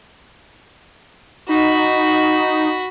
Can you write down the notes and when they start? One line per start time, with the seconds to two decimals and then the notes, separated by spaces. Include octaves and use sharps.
1.49 D#4 F#4 B5